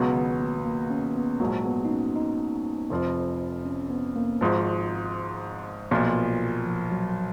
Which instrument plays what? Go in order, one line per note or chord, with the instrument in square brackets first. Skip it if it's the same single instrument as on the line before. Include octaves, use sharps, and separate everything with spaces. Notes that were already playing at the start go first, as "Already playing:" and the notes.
Already playing: [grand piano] C#2 B2 F#3 B3 F#4
[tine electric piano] D#3
A#3
B3
A#3
C#4
B3
[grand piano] A#1 G#2 F#3 [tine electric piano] A#3
[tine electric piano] B3
D#4
C#4
D#4
[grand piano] F1 F2 F3
[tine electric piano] C#4
C#4
B3
A#3
[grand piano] G#1 G#2 F3
B1 A#2 F3
[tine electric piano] F3
F#3